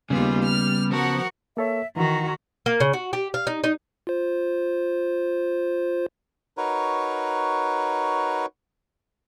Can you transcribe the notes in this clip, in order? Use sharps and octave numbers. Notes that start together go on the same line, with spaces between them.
D#2 C#3 G3 B3 F4 G#4
F6
F3 F#4 A#4 F#5 A5
A#3 A4 C#5 E5
D#3 E3 F#4 A#5
A#3
C#3
F#4
G4
F5
D#4
D#4
F4 C5
D#4 F#4 A#4 B4 C#5